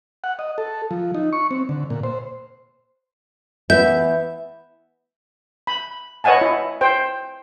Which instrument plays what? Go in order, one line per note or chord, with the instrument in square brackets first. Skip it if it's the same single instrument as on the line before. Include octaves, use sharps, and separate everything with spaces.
[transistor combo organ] F#5
D#5
A4
F3
D#4
C#6
C4
D3
A#2
C5
[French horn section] E3 B3 [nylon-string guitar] E5 [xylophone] G6
[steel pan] B5
B4 C#5 D#5 F#5 G#5 A5
E4
C5 G5